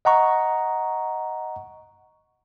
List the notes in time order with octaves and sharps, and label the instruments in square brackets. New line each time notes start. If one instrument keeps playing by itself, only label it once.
[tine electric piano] D#5 F#5 A#5 C#6